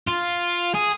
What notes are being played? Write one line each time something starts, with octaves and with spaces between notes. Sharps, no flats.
F4
G#4